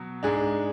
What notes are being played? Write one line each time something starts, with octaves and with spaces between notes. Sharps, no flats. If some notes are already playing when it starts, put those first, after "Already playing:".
Already playing: B2 F#3
G#2 G#3 D4 G#4